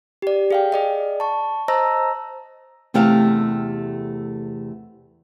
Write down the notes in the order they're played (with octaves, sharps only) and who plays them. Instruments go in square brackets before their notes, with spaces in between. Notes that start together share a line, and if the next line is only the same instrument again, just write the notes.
[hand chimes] G4 D5
G#4 F5 G5
G#4 D5 D#5
A5 C#6
C5 D#5 A5 A#5 E6 A#6
[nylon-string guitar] E2 C3 A3 G4 A4 F5